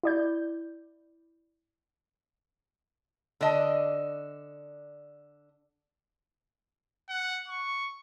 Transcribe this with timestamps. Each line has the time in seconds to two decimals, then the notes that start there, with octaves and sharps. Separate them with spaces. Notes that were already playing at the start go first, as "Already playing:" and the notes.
0.03 E4 D5 G6
3.41 D3 D4 D#5
7.09 F#5
7.48 C#6